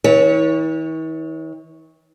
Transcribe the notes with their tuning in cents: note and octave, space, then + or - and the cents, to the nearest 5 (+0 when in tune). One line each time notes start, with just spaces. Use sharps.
E3 -45 C#5 +0